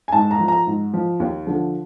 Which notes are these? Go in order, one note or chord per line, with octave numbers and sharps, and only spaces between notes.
G#5
G#2 A5
A#5
F3
A#5
G#2
F3
D#2
D3 F3